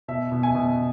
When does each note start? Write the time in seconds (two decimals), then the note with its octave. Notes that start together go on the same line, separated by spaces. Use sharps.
0.08 B2 E5
0.32 B2
0.43 G#5
0.55 B2